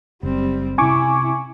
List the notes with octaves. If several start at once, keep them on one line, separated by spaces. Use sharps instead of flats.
F#1 G3 C4
C3 C#4 E4 G#5 C#6 D6